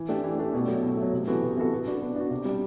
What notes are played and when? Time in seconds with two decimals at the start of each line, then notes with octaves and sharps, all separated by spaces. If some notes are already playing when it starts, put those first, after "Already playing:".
Already playing: E3
0.09 A3 D4 G4
0.24 E3
0.39 A3 D4 G4
0.54 B2
0.67 F#3 A3
0.83 B2
0.97 A3
1.03 F#3
1.13 C3
1.28 E3 B3 F#4 A4
1.42 C3
1.57 E3 B3 F#4 A4
1.72 B3
1.86 D4 F#4
2.02 B3
2.16 D4 F#4
2.31 C3
2.45 G3 D4